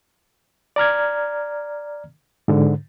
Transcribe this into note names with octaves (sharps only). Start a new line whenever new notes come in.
D5 A#5 F6 G#6
G#2 D3